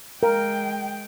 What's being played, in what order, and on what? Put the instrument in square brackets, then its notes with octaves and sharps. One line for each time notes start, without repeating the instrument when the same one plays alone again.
[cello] G#3 G5 [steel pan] A#4